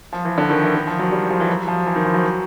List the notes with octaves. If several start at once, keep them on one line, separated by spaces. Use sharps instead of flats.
F3
E3
D3
D#3
E3
D#3
F3
F#3
G3
F3
E3
F#3
F3
E3
D#3
F3
F#3